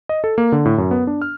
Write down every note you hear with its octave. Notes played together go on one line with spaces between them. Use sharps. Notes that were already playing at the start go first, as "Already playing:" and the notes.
D#5
A4
A#3
D3
A2
F#2
B3
D4
F6